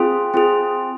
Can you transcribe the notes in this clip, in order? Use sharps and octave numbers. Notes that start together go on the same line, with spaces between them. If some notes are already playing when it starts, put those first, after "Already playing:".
Already playing: C4 F4 G#4
C4 F4 G#4